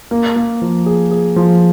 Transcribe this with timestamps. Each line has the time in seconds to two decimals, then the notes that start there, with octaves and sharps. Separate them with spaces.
0.11 A#3
0.36 A#3
0.62 F3
0.86 G#4
1.11 G#4
1.36 F3